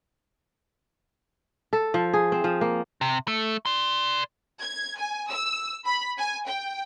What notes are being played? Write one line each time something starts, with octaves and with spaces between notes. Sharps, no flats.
A4
F3
G#4
C4
F3
A#3
C3
A3
D5 C6
G#6
G#5
E6
B5
G#5
G5